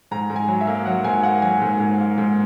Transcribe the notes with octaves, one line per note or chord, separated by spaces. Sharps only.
G#2 A#5
G#2
G#5
F#3
E5
A#3
F#3 F#5
G#2 G#5
A#3 F#5
F#3 G#5
G#2
G#2
A#3
G#2